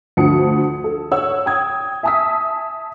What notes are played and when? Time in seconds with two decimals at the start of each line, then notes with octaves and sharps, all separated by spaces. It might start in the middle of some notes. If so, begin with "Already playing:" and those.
0.17 D2 D3 F3 A5 D#6 C#7
0.84 A4
1.12 C#5 F#5 E6
1.46 G5 D#6 G#6
2.03 E5 G#5 A5 D#6 E6 B6